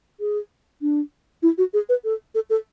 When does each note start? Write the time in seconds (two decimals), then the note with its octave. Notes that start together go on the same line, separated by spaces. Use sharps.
0.20 G#4
0.82 D4
1.43 E4
1.58 F#4
1.74 G#4
1.89 B4
2.04 A4
2.35 A4
2.50 A4